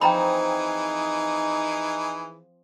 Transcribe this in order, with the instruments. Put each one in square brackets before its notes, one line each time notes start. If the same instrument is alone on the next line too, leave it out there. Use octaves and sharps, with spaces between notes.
[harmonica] E3 G#4 [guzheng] F3 C4 [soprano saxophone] D#4 [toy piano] G5 A#5 B5